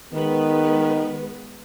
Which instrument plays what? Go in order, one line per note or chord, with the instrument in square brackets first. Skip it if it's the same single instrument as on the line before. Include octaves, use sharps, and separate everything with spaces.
[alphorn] D#3 [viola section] G#3 B3 B4